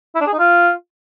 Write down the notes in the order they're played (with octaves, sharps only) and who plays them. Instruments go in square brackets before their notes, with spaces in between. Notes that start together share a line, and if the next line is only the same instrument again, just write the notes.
[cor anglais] E4
D4
G#4
D#4
F4